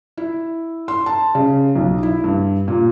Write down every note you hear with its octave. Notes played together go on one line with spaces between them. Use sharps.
E4
C6
A5
C#3
B1
E4
G2
A#2